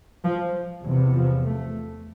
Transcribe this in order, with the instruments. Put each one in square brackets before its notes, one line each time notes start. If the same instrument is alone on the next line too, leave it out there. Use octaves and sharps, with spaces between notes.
[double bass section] F3
E2 C3 F#3
F3
A3